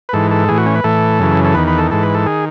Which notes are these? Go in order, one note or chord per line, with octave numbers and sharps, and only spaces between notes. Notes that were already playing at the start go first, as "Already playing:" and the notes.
B4
G#2 E3 A4
A4
A2 E3 G#4
F#4
C#4
B4
A2 E3 A4
F#2 C#3 E3
A4
E2 D#3 B4
B4
A4
G#2 E3 A4
B4
A4
D#3 G#4